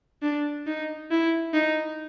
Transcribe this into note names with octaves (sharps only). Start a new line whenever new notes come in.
D4
D#4
E4
D#4